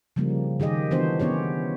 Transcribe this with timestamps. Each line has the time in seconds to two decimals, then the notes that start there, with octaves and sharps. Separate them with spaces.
0.16 C#3 F3 G3 A#3
0.60 D#3 G4 G#4 D#5
0.91 E3 B3 D4 F#4 C5
1.20 B3 C#4 G4 C#5